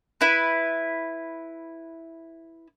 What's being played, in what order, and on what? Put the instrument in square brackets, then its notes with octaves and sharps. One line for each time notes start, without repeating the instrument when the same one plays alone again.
[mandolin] E4 B4